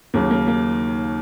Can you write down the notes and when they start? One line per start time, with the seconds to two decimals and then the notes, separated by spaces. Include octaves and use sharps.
0.14 D#2 C#3 F#3 A#3
0.31 A#3
0.47 A#3